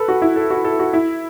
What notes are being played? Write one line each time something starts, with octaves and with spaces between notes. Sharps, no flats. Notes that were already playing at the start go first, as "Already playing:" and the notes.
Already playing: A4 B4
F#4
E4
A4
F#4
A4
F#4
E4